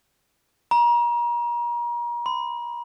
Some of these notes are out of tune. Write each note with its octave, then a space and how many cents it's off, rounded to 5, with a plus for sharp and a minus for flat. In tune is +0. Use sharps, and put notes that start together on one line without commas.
A#5 +35
C6 -45